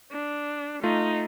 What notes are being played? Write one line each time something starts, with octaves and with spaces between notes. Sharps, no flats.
D4
A3 D#4 F4